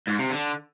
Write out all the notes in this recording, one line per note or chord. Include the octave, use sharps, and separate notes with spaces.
G#2
C3
D3